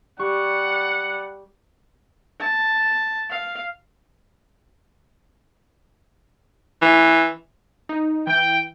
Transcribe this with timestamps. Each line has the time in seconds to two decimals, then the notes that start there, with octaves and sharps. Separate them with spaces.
0.19 G3 G4 F#5 C#6
2.40 A5
3.30 F5
6.82 E3
7.89 D#4
8.27 E3 G5